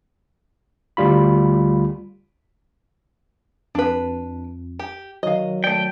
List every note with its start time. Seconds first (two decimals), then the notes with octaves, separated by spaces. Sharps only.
0.97 D2 G3 F4 B5
3.75 F2 D4 B4
4.79 G4
5.23 D#3 F#3 D#5 F5
5.64 A3 D5 G5